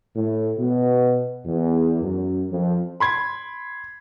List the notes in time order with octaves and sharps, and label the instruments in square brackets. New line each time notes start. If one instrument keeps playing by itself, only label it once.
[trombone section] A2
B2
E2
F#2
F2
[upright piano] B5 C6 G#6